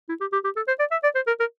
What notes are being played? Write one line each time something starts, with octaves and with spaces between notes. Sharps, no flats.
E4
G4
G4
G4
A4
C5
D5
E5
D5
C5
A#4
A#4